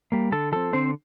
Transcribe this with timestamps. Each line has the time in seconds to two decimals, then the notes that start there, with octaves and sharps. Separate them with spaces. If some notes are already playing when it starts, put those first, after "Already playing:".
0.12 G3 A#3
0.32 D3 A4 A5
0.52 F3 C4 A4 A5
0.73 D3 C4 C5